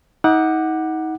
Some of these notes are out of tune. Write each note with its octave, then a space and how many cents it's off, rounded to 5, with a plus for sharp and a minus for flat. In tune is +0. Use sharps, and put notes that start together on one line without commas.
D#4 +35 F#5 +0 D6 +15